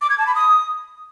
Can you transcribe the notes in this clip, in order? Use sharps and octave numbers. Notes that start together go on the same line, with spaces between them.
D6
G#6
A5
B5
D#6